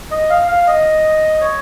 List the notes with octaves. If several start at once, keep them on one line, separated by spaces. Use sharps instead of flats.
D#5
F5
F5
D#5
C#5